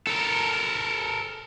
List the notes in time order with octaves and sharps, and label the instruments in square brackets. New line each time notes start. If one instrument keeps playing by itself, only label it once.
[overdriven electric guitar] A4 A#4